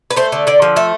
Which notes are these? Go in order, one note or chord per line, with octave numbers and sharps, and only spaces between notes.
B4
A3 C5
D3
D3 D5
F3
A3 E5